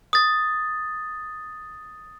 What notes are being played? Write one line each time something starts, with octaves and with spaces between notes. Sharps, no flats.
D#6 A6